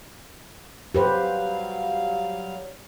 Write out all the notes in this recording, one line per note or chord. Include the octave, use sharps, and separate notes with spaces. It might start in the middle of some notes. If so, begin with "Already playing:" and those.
F#3 G3 G4 B4 C5 F5